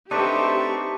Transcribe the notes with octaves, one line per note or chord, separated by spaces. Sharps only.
A3 C4 D4 D#4 G4 B4 C5 C#6